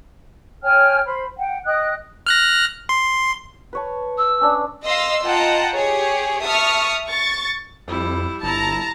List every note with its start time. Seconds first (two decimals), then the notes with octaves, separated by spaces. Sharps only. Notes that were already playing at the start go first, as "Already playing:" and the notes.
0.63 C#5 G5 G#5 F6
1.05 C5 B5
1.37 F#5 G5
1.66 D#5 G5 D#6 F#6
2.26 F6 F#6 A#6
2.89 C6
3.73 B4 C#5 A5
4.18 E6
4.41 C#4 D4
4.85 D#5 F5 C6 E6
5.23 F4 D#5 F#5 G5 A5 A#5
5.74 G4 G#4 C#5
6.43 E5 A5 C#6 D#6 F6
7.10 C#6 A6
7.88 F2 G3 E4
8.43 G1 E4 A5 A#5